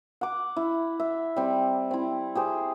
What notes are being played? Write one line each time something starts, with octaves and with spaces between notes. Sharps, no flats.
F#5 D6
E4
E5
G3 C4
C4 E4
G4 G#4 C5